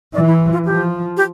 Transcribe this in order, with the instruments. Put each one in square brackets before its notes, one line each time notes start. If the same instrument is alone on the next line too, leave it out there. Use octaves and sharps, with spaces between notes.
[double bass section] E3 [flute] D5
[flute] E4
F4
[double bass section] F3 [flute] G4
[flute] G4